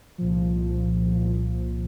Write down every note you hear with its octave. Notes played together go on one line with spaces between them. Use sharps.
C2 A#2 F3
C2 A#2 F3